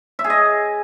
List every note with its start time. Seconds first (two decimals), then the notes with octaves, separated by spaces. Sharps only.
0.19 E5
0.24 G#4
0.30 D#5